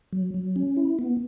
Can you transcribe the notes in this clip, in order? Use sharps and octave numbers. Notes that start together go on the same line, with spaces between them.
F#3
F#3
C#4
E4
B3